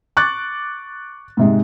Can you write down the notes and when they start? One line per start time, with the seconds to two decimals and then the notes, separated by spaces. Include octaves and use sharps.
0.17 C#6 D6 F#6 A6
1.37 G#2 C3 G#3